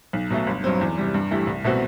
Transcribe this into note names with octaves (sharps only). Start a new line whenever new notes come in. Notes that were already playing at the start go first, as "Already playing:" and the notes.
B1
B2 F#3 A3
G1
G2 F#3 C4
E2
C3 G3
G2
E3 A3 E4 G4
C2
B2 A3 C4 F#4